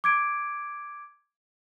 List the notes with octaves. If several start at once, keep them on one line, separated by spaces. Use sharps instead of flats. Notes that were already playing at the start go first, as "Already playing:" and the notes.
D6 G#6 D7